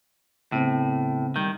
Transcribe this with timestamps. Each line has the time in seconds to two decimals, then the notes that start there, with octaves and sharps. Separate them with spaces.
0.52 A2 C#3 B3 C4
1.36 D#3 G3 G6